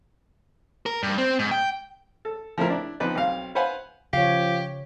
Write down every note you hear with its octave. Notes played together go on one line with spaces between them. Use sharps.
A#4
G2
C4
G#2
G5
A4
F3 A3 C4 E4 A#4
D4 E4
F3 B3 C4 D#4 B4 D5
B1 C4 F5
B4 C5 F5 F#5 G#5 B5
C#3 F3 G4 C#5 F5